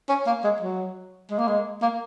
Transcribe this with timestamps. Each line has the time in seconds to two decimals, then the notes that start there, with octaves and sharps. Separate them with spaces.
0.09 C#4
0.27 A#3
0.44 G#3
0.61 F#3
1.31 G#3
1.38 A#3
1.47 G#3
1.82 A#3